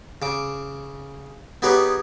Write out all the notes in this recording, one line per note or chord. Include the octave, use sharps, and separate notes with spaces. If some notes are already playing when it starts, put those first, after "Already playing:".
C#3 D6
B3 D#4 G4 G#4 B4 C#5